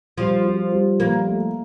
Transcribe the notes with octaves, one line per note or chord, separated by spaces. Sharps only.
F3 G3
F4
G3
F3 A#3
A3